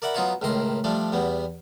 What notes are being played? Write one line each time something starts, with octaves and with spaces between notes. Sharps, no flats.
A#4 D5 E5 F#5 B5
F#3 B3 D#4 F4 F#4 C#5
C#2 A2 D#3 A#5 C6
F3 G3 A3 D4
E2 G3 B3